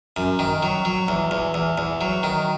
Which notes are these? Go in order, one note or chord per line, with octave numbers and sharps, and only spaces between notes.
F#2
D#3
F#3
F#3
E2
E2
E2
E2
F#3
D#3